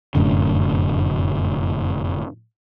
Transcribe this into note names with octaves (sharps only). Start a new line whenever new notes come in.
F1 F#2 A2 D3